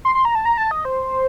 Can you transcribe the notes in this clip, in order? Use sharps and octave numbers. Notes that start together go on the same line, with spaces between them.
C6
C6
A#5
A5
A#5
A5
D#5
C5